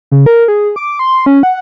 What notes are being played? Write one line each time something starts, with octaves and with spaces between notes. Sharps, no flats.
C#3
A#4
G#4
D6
C6
C#4
F#5